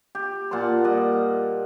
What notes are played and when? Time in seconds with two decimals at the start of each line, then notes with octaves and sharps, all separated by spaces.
0.15 G4
0.51 A#2 F#5 A5 C6
0.84 G3 D#5 F#5